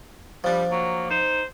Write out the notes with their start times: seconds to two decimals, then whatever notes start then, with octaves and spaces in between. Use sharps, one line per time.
0.44 F3 G3 D4
0.70 F#3 A#3
1.09 D#4 C5